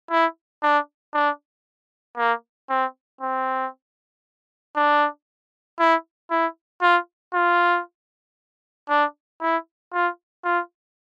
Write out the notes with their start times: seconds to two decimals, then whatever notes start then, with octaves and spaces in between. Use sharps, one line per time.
0.10 E4
0.63 D4
1.14 D4
2.17 A#3
2.70 C4
3.21 C4
4.76 D4
5.80 E4
6.31 E4
6.82 F4
7.34 F4
8.89 D4
9.41 E4
9.93 F4
10.45 F4